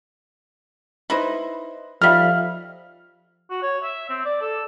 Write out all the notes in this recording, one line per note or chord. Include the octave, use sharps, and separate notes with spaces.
D#4 E4 B4 C5
F3 G3 D#4 A4 E5 F5 F6
F#4
C#5
E5
C4
D5
A4